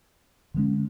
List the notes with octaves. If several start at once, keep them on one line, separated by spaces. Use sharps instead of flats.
D3 F3 G#3 C#4